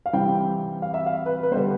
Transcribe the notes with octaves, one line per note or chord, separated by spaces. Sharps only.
F5
C3 E3 G3 C4 G5
F5
E5
F5
B4
B4
D3 G3 B3 C5